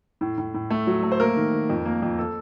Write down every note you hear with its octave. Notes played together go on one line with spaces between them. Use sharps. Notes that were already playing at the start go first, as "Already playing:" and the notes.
A2
A2
A2
A3
F#3
A3
C5
A#3 A#4
D#3
D#3
F2
A#3
F2
A4